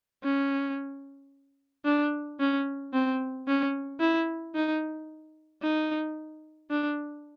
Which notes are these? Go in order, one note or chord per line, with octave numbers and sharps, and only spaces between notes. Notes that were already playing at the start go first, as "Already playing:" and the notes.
C#4
D4
C#4
C4
C#4
E4
D#4
D#4
D4